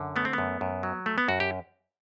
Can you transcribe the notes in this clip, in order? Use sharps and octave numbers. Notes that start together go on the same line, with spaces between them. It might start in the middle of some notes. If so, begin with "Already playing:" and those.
Already playing: F#2 D3
A3 B3
C4
F#2 B3
F#2
F#3
A3
B3
F#2 F#4
G4